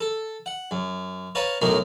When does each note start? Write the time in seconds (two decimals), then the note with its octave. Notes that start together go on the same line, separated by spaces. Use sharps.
0.01 A4
0.46 F#5
0.71 F#2
1.35 B4 C#5 F5 A5 A#5
1.61 B1 F#2 A2 D#4 F#4 A#4